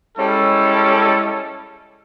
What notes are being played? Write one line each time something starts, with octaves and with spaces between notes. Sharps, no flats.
G3 G#3 C#4 E4 A4